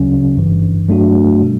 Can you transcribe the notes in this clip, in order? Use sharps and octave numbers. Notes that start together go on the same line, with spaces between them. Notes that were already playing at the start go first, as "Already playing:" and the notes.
Already playing: D2 C#3 F#3 C#4
G1 G2 E3
G2 F#3 A3 D4 F#4
B2 G3